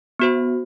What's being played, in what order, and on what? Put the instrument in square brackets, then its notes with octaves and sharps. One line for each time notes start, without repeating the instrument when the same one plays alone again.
[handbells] B3 F#4 C5